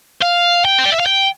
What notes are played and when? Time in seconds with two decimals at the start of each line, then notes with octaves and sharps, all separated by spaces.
0.22 F5
0.65 G5
0.78 C5
0.85 D5
0.92 E5
1.00 F5
1.06 G5